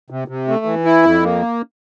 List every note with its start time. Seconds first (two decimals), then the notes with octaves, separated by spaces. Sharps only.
0.10 C3
0.28 C3
0.48 A3
0.65 E3
0.85 E4
1.03 F2
1.22 A#3